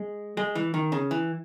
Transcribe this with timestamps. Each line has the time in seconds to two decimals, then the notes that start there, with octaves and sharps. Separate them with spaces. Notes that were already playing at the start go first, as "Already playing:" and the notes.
Already playing: G#3
0.37 G#3
0.55 E3
0.74 D#3
0.92 C#3
1.11 E3